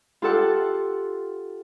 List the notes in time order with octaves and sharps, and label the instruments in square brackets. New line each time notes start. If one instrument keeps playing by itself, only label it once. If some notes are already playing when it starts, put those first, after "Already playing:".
[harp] F4 G4 A4 F#5